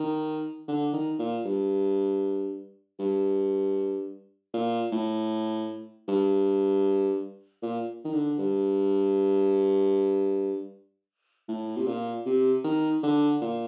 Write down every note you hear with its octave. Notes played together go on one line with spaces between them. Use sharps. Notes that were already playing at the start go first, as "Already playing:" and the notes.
Already playing: D#3
D3
D#3
A#2
G2
G2
A#2
A2
G2
A#2
D#3
D3
G2
A2
C3
A#2
C3
D#3
D3
A#2